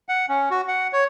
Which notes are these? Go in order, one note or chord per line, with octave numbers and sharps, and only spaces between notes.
F#5
C#4
F#4
F#5
C#5